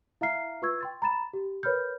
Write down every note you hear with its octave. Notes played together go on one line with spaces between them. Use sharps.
E4 E5 F5 A#5 F6 C7
F4 B4 C#6 E6 G#6
G5 C6 A6
A#5 B5 A6 E7
G4
A#4 B4 C#5 B5 F6 G6